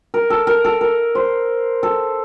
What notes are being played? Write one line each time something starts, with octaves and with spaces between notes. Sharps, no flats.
A#4
A4
A#4
A4
A#4
C5
A4